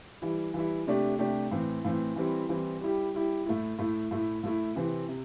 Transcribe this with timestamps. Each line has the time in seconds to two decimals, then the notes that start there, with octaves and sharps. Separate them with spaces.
0.22 E3 G3 E4
0.54 E3 G3 E4
0.87 C3 A3 D4 G4
1.19 C3 A3 D4 G4
1.51 A2 E3 C4
1.85 A2 E3 C4
2.16 E3 G3 C4 E4
2.49 E3 G3 C4 E4
2.81 G3 E4 G4
3.14 G3 E4 G4
3.46 A2 A3 E4
3.79 A2 A3 E4
4.11 A2 A3 E4
4.43 A2 A3 E4
4.75 C3 E3 C4
5.08 C3